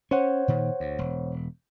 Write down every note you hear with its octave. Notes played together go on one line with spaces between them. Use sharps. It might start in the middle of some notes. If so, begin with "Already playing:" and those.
C#4 C5 C#5 F#5
A#2 D#3
D2
E1